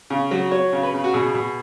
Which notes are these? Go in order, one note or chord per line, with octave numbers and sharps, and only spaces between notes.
C#3
F#3
F#3 C#5
C#3
B4
C#3
F#4
B2 G#4
B2